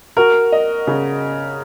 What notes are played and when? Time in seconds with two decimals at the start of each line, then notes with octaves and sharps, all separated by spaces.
0.17 F#4 A#4
0.52 D#5
0.87 C#3